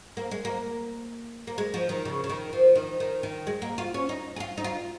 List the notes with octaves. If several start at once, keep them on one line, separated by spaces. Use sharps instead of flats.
A#3
G#3
A#3
A#3
G#3
F3
D#3
C#3
C#3
D#3
F3
D#3
D#3
D#3
G#3
A#3
F4
C#4
D#4
G#4
F4
D#4
F4